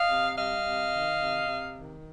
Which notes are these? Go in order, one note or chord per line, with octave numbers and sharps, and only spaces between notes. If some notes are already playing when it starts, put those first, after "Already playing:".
Already playing: D#5 F5
C3
G3 D#5 F5
C3
D#3
C3
C3
D#3